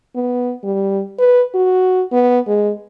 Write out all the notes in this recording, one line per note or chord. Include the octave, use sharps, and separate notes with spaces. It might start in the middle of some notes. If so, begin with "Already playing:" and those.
B3
G3
B4
F#4
B3
G#3